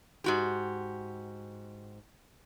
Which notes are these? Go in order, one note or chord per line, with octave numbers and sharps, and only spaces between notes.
G#2 F#4 G4